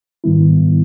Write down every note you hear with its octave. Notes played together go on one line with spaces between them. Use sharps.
G#2 D#3 G3 B3 E4